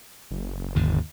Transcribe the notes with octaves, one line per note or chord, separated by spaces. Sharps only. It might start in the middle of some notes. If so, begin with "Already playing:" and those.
F#1
D#2 G#2 D3